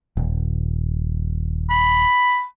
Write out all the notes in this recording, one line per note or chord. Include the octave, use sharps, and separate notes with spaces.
D#1
B5